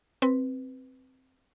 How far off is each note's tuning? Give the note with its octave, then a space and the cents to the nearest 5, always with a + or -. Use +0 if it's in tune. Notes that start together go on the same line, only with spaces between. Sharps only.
C4 +0 B4 +0